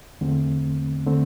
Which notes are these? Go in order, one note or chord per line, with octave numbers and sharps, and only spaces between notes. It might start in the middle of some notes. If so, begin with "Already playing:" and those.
E2 D3 A3 C4
D3 A3 C4